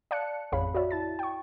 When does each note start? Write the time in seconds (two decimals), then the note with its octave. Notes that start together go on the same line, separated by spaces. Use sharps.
0.11 D5 F5 A5 F#6 C#7
0.52 A1 F2 G#4 C#5 F5 B5
0.74 F#4 C#5 D5 E5
0.91 E4 A5 A6
1.19 G5 C#6